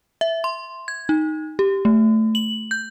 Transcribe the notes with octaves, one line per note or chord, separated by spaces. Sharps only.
E5
C6
G#6
D#4
G4
A3
F#7
G6